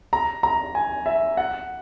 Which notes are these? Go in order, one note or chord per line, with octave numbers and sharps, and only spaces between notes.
A#5
A#5
G#5
E5
F#5